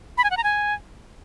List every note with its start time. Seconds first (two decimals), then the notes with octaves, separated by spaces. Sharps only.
0.18 B5
0.24 G#5
0.31 F#5
0.37 A#5
0.44 G#5